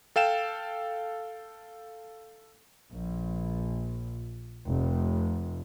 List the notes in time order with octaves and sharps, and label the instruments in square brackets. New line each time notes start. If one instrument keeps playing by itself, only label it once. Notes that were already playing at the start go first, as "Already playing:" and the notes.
[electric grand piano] A4 F5 G5 E7
[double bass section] A#1
F1